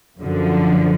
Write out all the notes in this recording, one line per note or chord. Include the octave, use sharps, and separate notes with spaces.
F#2 D3 F3